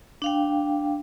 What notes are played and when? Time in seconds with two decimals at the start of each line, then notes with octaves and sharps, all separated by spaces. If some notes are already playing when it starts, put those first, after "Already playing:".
0.22 D4 F5 G5